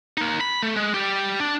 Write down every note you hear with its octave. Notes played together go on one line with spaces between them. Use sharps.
A#3 D#4
B5
A3
G#3
G3 G4
D4